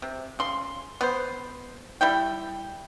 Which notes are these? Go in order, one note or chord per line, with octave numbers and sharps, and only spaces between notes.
C3
C#3 C6
B3 C5
G3 E4 G5